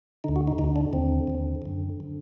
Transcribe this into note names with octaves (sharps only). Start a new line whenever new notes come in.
D2 D3 D#4
F#4
D#4
D2 D3 D#4
D4
D#2 D3 C4
D#2 D3
F#2 D3
D3